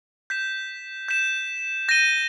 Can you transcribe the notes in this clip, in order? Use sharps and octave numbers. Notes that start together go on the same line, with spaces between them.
G6 B6 E7
G6 B6 E7
G6 A#6 D#7 G7